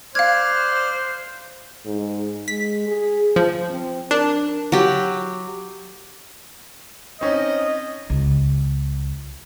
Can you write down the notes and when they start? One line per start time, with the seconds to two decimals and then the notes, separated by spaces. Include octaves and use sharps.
0.15 C5 D5 F5 F6 F#6 G#6
1.86 G#2
2.48 G#3 B6
2.88 G#4
3.36 F3
3.70 C4
4.11 D4 A#4
4.72 F#3 G4
7.21 C4 C#4 D#4 D#5
8.10 C#2